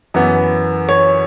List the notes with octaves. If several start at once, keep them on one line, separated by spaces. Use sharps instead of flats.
F#2 E3 B3
C#5